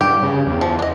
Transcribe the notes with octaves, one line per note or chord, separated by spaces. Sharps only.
G2 G4
C#3
E2
F3
D4 D#5